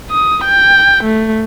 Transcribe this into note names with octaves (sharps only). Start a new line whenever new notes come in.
D#6
G5
A3